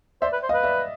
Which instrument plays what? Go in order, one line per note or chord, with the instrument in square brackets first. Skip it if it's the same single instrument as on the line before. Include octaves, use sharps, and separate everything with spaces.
[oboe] C5 [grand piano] D5 E5
[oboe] B4
C5
[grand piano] D#5 F5
[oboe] B4
[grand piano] D5 E5